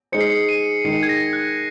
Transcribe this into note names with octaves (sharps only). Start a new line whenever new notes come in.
G#3 D#4 G#4 C5 C#7
C7
C#7
D#7
D#3 G#3 D#4 G#4 C#7
G#6
A#6
F#6